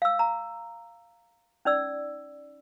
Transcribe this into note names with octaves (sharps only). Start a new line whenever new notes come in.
F5 E6
A#5
C#4 D#4 D5 E6